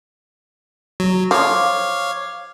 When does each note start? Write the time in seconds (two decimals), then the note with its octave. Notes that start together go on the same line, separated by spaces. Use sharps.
1.00 F#3
1.31 F3 C#5 F5 D6